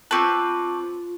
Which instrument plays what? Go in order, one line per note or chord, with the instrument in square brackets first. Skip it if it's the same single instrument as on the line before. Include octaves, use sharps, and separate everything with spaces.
[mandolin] C4 B4 [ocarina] F4 [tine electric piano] A5 C#6 D6